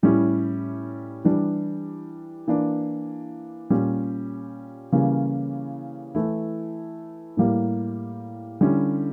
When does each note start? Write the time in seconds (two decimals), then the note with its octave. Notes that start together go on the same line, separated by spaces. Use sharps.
0.03 A2 G3 C#4 E4
1.25 E3 G3 D4
2.48 E3 A#3 D4
3.70 A#2 G3 C#4
4.92 C#3 E3 G3 A#3 C#4
6.15 E3 A3 E4
7.37 A2 G3 A#3
8.61 D3 G3 C#4 E4